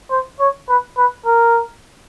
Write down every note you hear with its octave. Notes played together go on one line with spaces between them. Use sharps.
C5
C#5
B4
B4
A#4